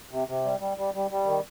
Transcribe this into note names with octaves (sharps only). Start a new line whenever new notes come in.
C3
C3
G3
G3
G3
G3
G3
D#3